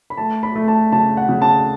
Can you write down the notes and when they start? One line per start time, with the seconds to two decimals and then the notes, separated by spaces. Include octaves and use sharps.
0.10 B5
0.18 A3 A5
0.43 B5
0.56 A3
0.68 A5
0.92 C#3 A5
1.17 F#5
1.29 C#3
1.42 A5